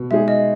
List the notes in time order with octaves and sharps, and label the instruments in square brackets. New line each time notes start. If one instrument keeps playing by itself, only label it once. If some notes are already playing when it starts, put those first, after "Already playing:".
Already playing: [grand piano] B2
[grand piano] G#3 D#4 G#4 [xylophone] E5
[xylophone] D#5